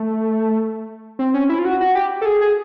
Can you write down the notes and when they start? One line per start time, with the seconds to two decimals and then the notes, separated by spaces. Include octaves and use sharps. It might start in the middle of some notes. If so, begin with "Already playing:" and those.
Already playing: A3
1.19 C4
1.34 C#4
1.49 E4
1.59 F4
1.65 F#4
1.81 F#4
1.95 G4
2.21 A4
2.26 G#4
2.41 G#4